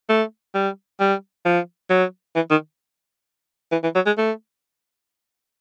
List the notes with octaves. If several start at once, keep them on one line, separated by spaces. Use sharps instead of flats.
A3
G3
G3
F3
F#3
E3
D#3
E3
E3
F#3
G#3
A3